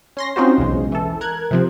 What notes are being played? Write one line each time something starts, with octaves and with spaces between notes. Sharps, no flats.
C#4 C6 A#6
C4 C#4 D#4 F4 F#4 C5
B1 E2 C#3 G#3
E3 A4
A#4 F#6 G#6
C3 F3 C4